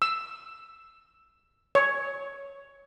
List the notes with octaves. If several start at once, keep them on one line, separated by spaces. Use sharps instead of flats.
E6
C#5